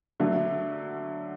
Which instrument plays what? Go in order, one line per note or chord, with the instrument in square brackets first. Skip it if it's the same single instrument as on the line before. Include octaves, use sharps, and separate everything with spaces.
[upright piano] D3 F#3 A3